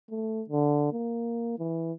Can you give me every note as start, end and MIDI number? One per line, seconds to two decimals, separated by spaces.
0.10 0.42 57
0.49 0.88 50
0.93 1.55 58
1.58 1.92 52